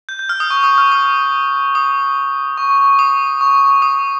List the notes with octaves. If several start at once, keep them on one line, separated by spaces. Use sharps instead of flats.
G6
G6
F6
D#6
C#6
D#6
F6
D#6
D#6
C#6
D#6
C#6
D#6